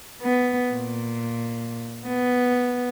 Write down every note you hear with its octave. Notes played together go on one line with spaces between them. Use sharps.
B3
A#2
B3